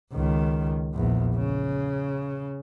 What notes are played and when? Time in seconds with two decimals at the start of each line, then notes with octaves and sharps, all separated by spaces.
0.13 C#2 D#3
0.93 A#1 E2
1.36 C#3